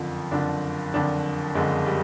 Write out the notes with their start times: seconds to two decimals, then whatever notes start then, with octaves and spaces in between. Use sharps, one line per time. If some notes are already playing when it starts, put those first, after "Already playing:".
Already playing: F#1 F2 D3 F4
0.32 F#1 F2 D3 D4
0.93 F#1 F2 D3 D4
1.55 F#1 F2 D3 G#3
1.86 G3